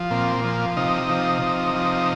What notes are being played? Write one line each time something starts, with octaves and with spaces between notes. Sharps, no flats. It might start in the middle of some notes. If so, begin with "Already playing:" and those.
Already playing: F3
A#2 C4
F3
C3 D#4
F3
C3
F3